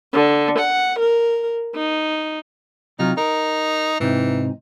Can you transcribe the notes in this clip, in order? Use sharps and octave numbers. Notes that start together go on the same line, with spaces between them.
D3
F#5
A#4
D#4
C3 F#3 D#4 F4
D#4 A#4
G#2 C3 E3 D#4